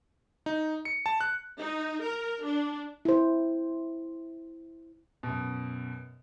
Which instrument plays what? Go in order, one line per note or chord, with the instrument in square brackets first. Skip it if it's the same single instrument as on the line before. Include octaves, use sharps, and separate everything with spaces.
[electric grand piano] D#4
C#7
A5
F#6
[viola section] D#4
A#4
D4
[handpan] E4 C5
[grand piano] F#2 B2